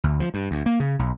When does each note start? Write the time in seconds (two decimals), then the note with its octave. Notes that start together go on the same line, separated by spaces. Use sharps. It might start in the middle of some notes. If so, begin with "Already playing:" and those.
0.04 D2
0.20 F3
0.34 G2
0.51 D2
0.66 A#3
0.80 C#3
0.99 B1